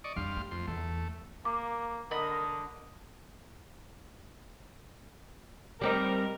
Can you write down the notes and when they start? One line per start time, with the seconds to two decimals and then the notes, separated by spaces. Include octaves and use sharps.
0.04 D5 D#5 C#6
0.16 F2 G3 D4 F5 C6
0.37 A3
0.51 F2 C6
0.67 E2 A3
1.45 A#3 D6
2.11 D3 A#4 D#5 B5 D#6
5.81 G3 C4 D#4 A#4